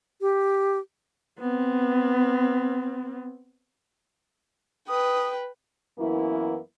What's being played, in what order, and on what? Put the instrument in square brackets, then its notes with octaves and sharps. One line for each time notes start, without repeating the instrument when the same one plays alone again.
[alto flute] G4
[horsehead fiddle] B3 C4
[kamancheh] B4 G5 [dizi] D#6
[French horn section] F#2 E3 A#3 B3 E4